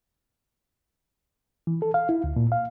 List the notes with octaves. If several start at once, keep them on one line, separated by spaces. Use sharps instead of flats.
E3
A4
F5
E4
D2
A#2
F5